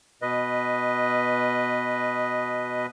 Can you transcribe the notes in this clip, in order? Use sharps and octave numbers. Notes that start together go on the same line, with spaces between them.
B2 B4 D#5